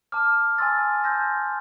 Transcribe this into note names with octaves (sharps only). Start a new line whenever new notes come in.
A5 D6 F6
G#5 C6 E6 A6
A5 C6 E6 G6 A#6